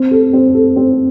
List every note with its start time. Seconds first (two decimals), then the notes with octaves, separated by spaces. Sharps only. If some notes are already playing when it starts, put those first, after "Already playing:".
Already playing: C4
0.11 A4
0.33 C4
0.55 A4
0.76 C4